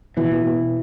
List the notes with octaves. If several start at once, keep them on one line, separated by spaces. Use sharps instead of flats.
B2 E3
B2
B2